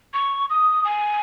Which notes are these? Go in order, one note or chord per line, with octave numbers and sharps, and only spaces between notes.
C#6
D#6
G#5